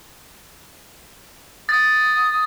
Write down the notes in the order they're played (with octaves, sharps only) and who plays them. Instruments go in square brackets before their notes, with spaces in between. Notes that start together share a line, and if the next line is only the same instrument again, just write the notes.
[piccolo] D#6 [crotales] A6